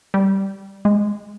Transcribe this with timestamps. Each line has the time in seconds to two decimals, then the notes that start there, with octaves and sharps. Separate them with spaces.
0.14 G3
0.85 G#3